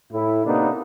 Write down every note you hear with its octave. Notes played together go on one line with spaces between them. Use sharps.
A2 E4
C3 A#3 B3 D4 D#4